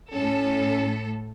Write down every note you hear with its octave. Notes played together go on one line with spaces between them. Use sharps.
A2 C#4 A4